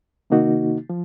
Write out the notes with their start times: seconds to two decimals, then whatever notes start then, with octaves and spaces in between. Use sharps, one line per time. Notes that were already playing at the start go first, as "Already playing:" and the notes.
0.30 C3 D#3 A#3 D#4 F#4
0.90 F3